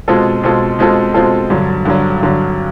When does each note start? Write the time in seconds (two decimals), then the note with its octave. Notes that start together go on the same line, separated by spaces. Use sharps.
0.08 B2 G#3 C4 F4 A4
0.43 B2 G#3 C4 F4 A4
0.79 B2 G#3 C4 F4 A4
1.14 B2 G#3 C4 F4 A4
1.50 G2 D3 F#3
1.85 G2 D3 F#3
2.21 G2 D3 F#3